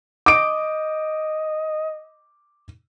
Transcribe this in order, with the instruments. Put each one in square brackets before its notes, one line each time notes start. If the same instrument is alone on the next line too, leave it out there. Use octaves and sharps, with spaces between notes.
[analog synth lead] D#5 [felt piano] D6 D7